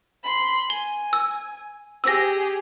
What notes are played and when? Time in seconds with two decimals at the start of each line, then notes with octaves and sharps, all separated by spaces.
0.24 B5 C6
0.70 G#5 G7
1.13 E6
2.04 G4 G#4 E6 A#6